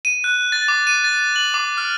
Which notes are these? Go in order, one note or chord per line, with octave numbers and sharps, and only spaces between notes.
D#7
F#6
A6
D6
D#7
A6
F#7
D6
F6